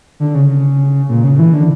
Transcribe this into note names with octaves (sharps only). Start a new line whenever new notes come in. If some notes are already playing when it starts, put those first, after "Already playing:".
D3
C#3
A#2
C#3
E3
D3